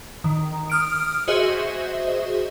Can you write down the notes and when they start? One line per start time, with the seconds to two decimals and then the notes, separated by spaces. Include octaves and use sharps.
0.24 D#3
0.70 D#6 F6 D7
1.28 F#4 G#4 C5 D#5 E5